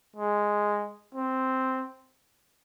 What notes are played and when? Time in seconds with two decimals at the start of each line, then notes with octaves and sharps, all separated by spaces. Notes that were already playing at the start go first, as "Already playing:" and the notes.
0.16 G#3
1.14 C4